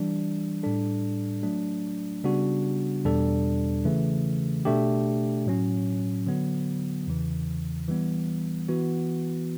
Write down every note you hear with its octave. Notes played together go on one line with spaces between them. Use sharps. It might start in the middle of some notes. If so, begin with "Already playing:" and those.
Already playing: E3 G3 D4
A2 G3 D4 A4
F#3 A3 D4
C#3 G3 B3 D4 F#4
E2 B2 G3 D4 A4
C#3 E3 A3
B2 A3 D4 G4
A2 F#3 C#4
D3 F#3 B3
E2 C#3 E3
E3 G3 B3
E3 B3 F#4